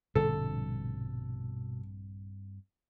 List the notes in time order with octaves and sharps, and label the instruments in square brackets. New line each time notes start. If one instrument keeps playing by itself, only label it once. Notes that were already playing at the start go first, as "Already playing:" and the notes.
[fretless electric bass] A#1 D3 G3 [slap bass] G2 C4 [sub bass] B2 [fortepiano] A4